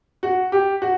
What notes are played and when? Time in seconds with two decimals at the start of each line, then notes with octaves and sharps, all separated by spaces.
0.23 F#4
0.52 G4
0.82 F#4